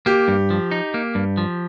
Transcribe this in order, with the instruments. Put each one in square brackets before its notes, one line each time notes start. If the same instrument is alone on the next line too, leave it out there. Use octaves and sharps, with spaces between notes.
[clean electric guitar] A#3 [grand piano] G4
[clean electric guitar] G2
F3
D#4
A#3
G2
F3